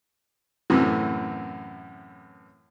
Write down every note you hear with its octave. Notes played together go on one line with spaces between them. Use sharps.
F#2 A2 C3 E3